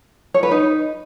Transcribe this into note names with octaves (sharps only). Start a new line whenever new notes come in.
C#5
B4
D#4